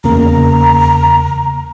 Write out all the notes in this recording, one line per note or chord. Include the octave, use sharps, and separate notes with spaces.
E2 C#3 A#3 A#5